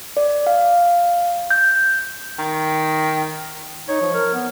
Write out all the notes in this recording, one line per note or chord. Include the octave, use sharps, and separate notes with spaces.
D5
F5
G6
D#3
D#4 C#5
F3
A#4
B3